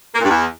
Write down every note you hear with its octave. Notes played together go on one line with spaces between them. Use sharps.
A#3
A#2
G2
E2